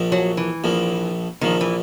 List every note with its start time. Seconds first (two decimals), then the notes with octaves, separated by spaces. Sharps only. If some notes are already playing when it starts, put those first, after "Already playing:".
Already playing: A#1 A#2 F3
0.12 F#3
0.37 E3
0.64 A#1 A#2 F3
1.41 A#1 A#2 D#3 F3
1.61 E3